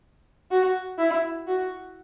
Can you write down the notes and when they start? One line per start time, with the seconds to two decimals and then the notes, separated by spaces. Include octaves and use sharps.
0.51 F#4
0.98 E4
1.47 F#4